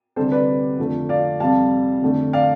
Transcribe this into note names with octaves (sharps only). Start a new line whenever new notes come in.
D2 C3 G3 A4 C5
B4 D5
F2 D3 F3 A3
D5 F5
F2 C3 G3 F5 A5
F2 D3 A3
D5 F5